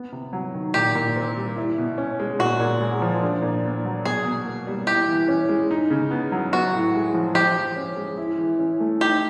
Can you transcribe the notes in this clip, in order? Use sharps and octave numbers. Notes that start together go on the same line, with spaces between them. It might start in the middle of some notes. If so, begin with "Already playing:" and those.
Already playing: B3
C3
F#3
D#3
A#2 G4
A#2
C4
G3
E4
B2
C#4
G#3
A#2 F#4
A#2
G#3
F3
D4
A#2
B3
F#3
B2 G#4
B2
A#3
G3
E4 G4
E3
C#4
G#3
D#4
C#3
B3
F#3
B3 F#4
A2
G#3
F3
F3 G4
F3
C#4
G#3
E4
E3
C#4
A3
D#4 G4